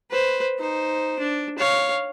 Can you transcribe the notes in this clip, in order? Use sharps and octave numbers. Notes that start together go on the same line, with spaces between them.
B4 C5
D#4 C5
D4
C#5 F5